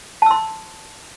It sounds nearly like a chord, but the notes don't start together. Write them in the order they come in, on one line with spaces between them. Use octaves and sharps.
A5 E6 C6